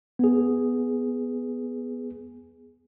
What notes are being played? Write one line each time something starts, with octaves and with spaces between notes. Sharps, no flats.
B3 G#4